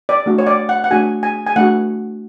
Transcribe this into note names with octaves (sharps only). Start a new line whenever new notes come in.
D5
A3 D4 F#4
C#5
D5
F#5
F#5
A3 D4 F#4 G#5
G#5
G#5
A3 D4 F#4 F#5